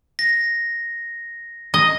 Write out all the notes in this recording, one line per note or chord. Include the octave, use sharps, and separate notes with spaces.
A#6
D#5